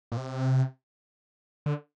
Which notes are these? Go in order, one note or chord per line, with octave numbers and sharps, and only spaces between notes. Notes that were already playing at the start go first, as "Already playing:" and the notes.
A#2
C3
D3